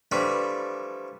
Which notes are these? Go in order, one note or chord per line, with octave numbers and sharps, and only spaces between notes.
E3 F3 G3 A3 D4